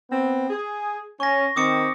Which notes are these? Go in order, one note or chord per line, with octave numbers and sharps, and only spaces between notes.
B3 C4
G#4
C#4 C#6 A#6
D#3 C4 D6 D#6 C#7